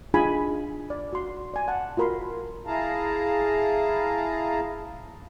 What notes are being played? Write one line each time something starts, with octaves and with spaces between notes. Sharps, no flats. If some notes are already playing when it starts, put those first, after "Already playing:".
D4 D#4 F4 G#4 G#5 B5
D5
F#4 C6
D5 G#5
F#5 A5
F4 F#4 A#4 B5 C6
E4 G#4 F5 A5 A#5